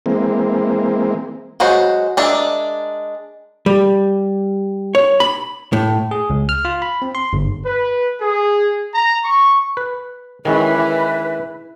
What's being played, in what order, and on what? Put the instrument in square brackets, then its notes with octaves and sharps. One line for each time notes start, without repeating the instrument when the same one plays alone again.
[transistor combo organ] E3 G#3 A#3 C4
[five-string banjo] F#3 G#3 F#4 C5
G#3 D4 A#4 E5
[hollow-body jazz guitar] G3
C#5
B5
A2
[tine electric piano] G#4
C#2
F6
F4
B5
C4
C6
G1
[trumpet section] B4
G#4
A#5
C#6
[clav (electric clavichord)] B4
[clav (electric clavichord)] D#3 G#3 C#4 [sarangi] E3 [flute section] B4